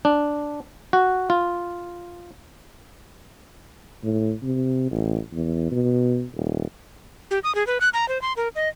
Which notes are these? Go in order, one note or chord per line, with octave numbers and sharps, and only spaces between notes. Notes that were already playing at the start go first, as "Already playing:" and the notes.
D4
F#4
F4
A2
C3
A1
E2
B2
D#1
G4
D#6
G#4
B4
F#6
A#5
C5
C6
A#4
D#5